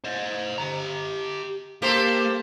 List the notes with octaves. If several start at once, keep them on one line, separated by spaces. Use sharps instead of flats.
C5 D#5
G4 A#5
A#3 G4 A4 A#4 C5